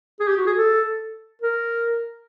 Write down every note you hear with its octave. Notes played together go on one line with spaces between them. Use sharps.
G#4
G4
F#4
G#4
A4
A#4